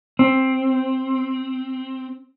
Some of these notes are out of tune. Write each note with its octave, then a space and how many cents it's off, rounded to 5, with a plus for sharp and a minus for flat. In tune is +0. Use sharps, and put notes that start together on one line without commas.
C4 +5